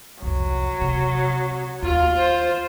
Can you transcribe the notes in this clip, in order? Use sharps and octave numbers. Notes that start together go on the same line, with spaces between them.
C2 F2 F#3
C3
D#2 F4
C5